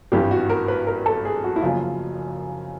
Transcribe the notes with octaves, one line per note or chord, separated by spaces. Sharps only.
G#1 G2 E3 G4
F#4
A#4
B4
A#4
A4
G#4
F#4
E4
F#1 F#2 C#3 F3 F4